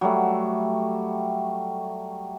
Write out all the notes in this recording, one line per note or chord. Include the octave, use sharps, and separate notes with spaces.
F#3 G3 A3